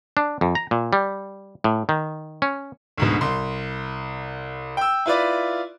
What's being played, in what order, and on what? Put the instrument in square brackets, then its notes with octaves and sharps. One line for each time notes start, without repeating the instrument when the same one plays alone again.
[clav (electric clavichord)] D4
F2
A#5
A#2
G3
A2
D#3
C#4
[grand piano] D2 G#2 B2
C2 C6
G5 E6
E4 F4 B4 D5